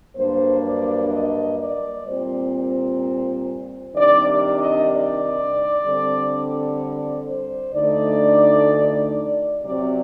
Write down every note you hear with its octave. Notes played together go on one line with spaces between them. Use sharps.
G2 F#3 A#3 D4 C5
D5
D#5
D5
A#2 G3 C4 C5
C5
C3 D#3 G3 D4 D5
D5
D#5
D5
D3 G3 C4
D5
C5
D2 D3 A3 D#4 D5
C3 F#3 C4 D5